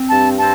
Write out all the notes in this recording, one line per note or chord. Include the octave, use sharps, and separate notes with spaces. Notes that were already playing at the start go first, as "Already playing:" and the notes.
Already playing: C4
G2 A5
C4 A5